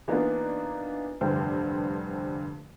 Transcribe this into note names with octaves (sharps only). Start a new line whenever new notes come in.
E3 A#3 B3 D4 D#4 F4
F1 G2 D3 E3 C5 G5